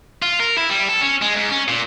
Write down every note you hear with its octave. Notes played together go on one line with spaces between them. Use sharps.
F4
A#4
E4
G3
A4
C#4
G#3
G#2
C#4
A#2